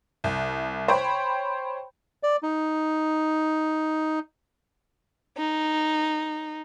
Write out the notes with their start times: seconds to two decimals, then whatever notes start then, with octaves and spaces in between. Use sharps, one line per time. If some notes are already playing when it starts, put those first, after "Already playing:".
0.24 C2
0.88 C5 C#5 G5 B5
2.23 D5
2.43 D#4
5.38 D#4